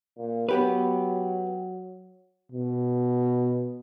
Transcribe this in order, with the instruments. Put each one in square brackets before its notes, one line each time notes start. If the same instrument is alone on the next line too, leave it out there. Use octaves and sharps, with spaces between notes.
[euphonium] A#2
[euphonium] F#3 [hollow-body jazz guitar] B3 G4 B4
[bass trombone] B2